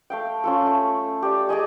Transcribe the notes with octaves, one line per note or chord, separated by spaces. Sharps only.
A3 F5 G5
C#4 F4 A4
A3
G4 D5
G#4 D5 D#5 G#5